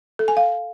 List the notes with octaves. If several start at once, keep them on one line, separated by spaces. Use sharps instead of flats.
A4
G#5
F5